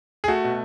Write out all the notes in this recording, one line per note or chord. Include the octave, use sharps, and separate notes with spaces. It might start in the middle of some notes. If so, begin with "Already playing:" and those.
G#4
A3 F#4
B2